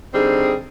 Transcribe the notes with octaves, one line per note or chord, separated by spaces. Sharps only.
D3 G3 C4 D#4 G#4